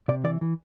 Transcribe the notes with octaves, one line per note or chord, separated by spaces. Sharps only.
C3 D5
E3 D5
E3